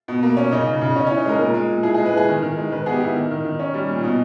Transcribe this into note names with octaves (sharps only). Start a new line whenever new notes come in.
B2
A#3
C#4
C#3 D#4
C#3
C#3
C#4 D#4
C#4
E3
D#4
G#3 A#4
A#2 A#4
G#3
A#2
E3 G#4
G#4
G#3
B4
E3 G#4
D#3
D#3
G#3
D#3 B4
B3 G#4
G4
B3 E4
D#3
D#3
D#3
C#4
G3
A#2
B2 D#4